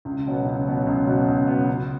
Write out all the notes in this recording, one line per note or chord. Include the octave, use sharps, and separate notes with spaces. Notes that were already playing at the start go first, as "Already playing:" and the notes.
C#2
B2 F#3 B3
C#2
B2 F#3 B3
C#2
B2 F#3 B3
C#2
B2 F#3 B3
C#2